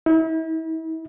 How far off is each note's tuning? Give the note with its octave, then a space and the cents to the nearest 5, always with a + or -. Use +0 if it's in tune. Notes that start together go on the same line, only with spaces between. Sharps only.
E4 -40